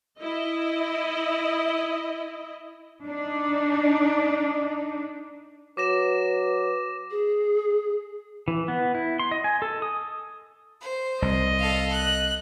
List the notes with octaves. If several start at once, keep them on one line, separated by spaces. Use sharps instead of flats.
E4 D#5
D4 D#4
F#3 B4 D6 A#6 E7
G#4
E3
B3
E4
C6
D#5
G#5
A4
D#6
C5
C2 D#5
A4 F5
F#6